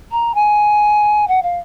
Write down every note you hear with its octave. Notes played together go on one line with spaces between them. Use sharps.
A#5
G#5
F#5
F5